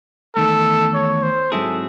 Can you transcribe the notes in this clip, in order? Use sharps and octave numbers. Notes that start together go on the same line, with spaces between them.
E2 D#3 A3 A4
C#5
C5
G#2 F#3 C4 E4 G#4 A4